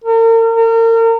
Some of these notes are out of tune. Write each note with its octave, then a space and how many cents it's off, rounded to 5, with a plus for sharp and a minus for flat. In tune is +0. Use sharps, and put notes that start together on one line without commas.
A#4 -40
A#4 -35